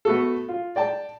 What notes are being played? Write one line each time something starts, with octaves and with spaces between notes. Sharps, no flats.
A3 B3 F#4 A4
F4
D5 G5 A5